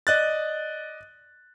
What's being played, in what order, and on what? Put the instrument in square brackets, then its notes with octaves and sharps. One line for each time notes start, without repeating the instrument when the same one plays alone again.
[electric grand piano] D5 D#5 F#6 A6